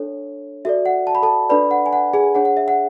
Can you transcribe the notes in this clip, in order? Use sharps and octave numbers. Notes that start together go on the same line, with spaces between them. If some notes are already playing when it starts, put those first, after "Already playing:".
Already playing: D4 A4 C#5
F#4 A4 D5 E5
F#5
A5
B5
A4 A5
D4 A4 B4 D5 B5
F#5
G#5
F#5
G#4 G#5
D4 G#4 C#5 F#5
F#5
E5
F#5